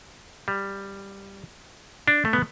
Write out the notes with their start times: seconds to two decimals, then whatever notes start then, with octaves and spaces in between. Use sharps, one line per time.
0.48 G3
2.08 D4
2.25 A3
2.33 B3